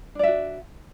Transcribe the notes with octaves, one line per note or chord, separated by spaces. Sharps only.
D4 F#4 D5 E5